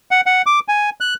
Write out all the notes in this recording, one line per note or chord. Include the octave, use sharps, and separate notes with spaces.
F#5
F#5
D6
G#5
F#6